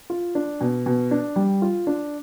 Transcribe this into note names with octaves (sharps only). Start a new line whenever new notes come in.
F4
D4
B2
B2
D4
G3
F4
D4